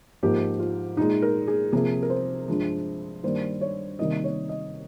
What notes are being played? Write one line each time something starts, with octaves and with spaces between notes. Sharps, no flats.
G#2 F3 A#3 G4
F4
A#2 G#3 D#4
A#4
G#4
C3 F3 A#3 G#4
A#4
C5
G2 F3 G#3
G2 D#3 G3 A#3 C5
C#5
C3 D#3 G3 A#3 D#5
C#5
D#5